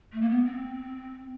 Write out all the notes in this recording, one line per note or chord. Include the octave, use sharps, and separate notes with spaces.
A3
A#3
B3
C4